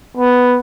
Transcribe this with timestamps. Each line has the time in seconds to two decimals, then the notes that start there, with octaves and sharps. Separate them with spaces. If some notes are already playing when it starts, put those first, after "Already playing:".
0.17 B3